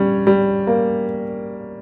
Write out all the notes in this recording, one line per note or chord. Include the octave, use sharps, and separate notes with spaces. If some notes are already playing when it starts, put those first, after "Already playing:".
Already playing: G3 C#4
G3
A#3